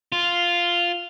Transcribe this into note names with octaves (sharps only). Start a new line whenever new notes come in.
F4